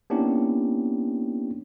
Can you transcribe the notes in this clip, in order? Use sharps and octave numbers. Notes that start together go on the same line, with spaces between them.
A#3 B3 C#4 D4 E4 G4